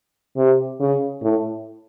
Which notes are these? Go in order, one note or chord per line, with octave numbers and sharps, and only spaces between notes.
C3
C#3
A2